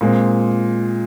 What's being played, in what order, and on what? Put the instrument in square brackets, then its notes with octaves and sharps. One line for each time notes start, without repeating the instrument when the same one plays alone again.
[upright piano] A#2 G#3 C4